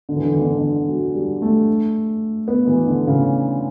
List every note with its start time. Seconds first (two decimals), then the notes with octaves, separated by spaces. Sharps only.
0.09 D3
0.16 E3
0.25 D3
0.34 E3
0.41 D3
0.50 E3
0.58 D3
0.88 F#3
1.15 G3
1.42 A3
2.48 B3
2.67 E3
2.87 D3
3.07 C#3